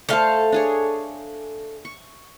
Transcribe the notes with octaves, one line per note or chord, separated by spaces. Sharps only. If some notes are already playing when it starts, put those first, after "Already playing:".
A3 A4 C5 F5
D4 G#4 C#5
C#6